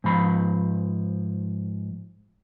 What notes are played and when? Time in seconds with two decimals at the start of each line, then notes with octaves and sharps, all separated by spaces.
0.04 G#2 F3 B5